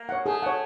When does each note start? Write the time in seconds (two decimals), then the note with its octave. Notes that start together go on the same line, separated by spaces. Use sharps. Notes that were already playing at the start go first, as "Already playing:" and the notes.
Already playing: A#3
0.09 C#5 F#5
0.26 A3 G#4
0.42 C#5 F#5